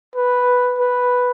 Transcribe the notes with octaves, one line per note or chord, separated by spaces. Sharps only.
B4
B4